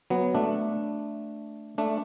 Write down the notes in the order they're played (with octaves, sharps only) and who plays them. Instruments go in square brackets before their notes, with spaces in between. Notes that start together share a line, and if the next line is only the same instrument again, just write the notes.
[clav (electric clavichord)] F#3 B3
A3 D4
A3 D4